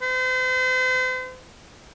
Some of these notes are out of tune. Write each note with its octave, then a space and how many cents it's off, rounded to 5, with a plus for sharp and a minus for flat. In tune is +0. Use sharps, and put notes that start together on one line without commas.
C5 -40